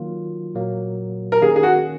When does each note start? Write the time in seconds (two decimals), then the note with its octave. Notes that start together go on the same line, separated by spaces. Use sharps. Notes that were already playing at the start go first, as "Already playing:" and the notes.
Already playing: D#3 F#3 A#3 F4
0.55 A#2 F#3 A#3
1.32 A#4
1.41 D#3 A#3 C#4 G#4
1.56 G#4
1.63 F#4